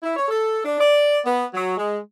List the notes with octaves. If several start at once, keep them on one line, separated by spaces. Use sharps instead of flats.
E4
C#5
A4
D4
D5
B3
F#3
G#3